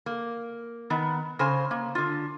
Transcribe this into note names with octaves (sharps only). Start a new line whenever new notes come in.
A#3
D#3 B3
C#3 C5 G#5
A#3
D3 F4